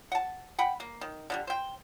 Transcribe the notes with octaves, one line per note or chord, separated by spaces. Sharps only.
F#5 A5
F#5 G5 B5
A#3
D#3
D3 D#3 G3
C5 G5